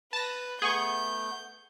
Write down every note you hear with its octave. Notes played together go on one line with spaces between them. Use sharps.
B4 A5 A#6
A3 B3 G#4 C#6 G6